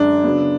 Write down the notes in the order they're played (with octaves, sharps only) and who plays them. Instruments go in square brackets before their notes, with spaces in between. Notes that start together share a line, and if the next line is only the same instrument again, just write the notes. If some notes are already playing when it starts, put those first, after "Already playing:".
Already playing: [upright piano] F#2 D3 G#3 [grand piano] D4
[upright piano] C#3 F#3 B3